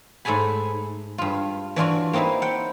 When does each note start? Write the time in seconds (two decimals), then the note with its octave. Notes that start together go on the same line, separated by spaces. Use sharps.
0.25 G#2 A3 G#4 G#5 B5
1.18 G2 F4
1.76 E3 D4 F4 F#4
2.13 A#3 C4 D#4 E4 E5
2.42 F#5 G5